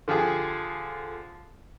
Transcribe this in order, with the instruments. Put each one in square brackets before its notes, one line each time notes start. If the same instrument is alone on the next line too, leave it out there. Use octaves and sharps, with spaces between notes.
[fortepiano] D3 F3 G4 G#4